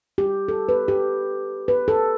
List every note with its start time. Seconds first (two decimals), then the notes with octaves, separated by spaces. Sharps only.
0.18 G4
0.48 A4
0.69 B4
0.88 G4
1.68 B4
1.88 A4